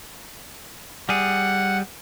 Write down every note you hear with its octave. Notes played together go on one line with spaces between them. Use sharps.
G3 G#4 F#5